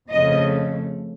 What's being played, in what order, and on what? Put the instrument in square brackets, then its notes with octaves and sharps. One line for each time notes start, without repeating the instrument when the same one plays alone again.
[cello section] F2 C#3 F3 A3 D#5